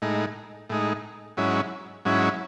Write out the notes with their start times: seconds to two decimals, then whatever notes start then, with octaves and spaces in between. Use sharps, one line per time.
0.02 A2 G#3 D#4
0.69 A2 G#3 D#4
1.37 G#2 F#3 C#4 E4
2.05 G#2 F#3 C#4 E4